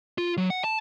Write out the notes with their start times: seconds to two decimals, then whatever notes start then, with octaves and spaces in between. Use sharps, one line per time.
0.18 F4
0.37 F#3
0.50 F#5
0.64 A5